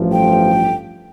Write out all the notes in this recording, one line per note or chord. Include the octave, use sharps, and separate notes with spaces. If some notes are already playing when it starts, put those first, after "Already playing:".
Already playing: A1 G2 F3 A3
G5